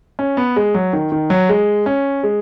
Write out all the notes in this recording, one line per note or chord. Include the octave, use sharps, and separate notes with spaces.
C#4
B3
G#3
F#3
D#3
D#3
F#3
G#3
C#4
G#3